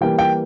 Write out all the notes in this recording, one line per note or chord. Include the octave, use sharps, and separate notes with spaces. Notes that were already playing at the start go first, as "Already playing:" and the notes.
E3 G3 A#3 G5
G5